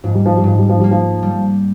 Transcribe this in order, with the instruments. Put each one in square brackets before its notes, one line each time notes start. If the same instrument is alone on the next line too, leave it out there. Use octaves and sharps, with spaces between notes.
[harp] G#2 [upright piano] F3
[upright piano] G3
F3
G3
[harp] G#2 [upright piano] F3
[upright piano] G3
F3
[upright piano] G3 [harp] A#3
[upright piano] F3
[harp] G3